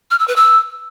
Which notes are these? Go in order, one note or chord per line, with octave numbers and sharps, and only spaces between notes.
F6
E6
B4
E6